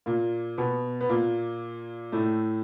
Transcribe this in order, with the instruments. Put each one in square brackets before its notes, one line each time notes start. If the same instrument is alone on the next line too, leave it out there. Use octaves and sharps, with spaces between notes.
[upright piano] A#2 A#3
B2 B3
B3
A#2 A#3
A2 A3